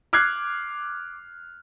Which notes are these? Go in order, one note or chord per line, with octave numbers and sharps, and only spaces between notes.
D6 F6 F#6 G#6 C7